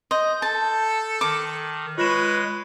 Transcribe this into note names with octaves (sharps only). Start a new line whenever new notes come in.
D#5 C6 G6
A4 A5
D#3 D6
G#3 F4 B4 C#5 A#6 E7